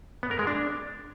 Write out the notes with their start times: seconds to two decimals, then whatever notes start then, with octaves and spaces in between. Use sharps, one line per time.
0.23 B3
0.31 A#4
0.39 G#3
0.47 D4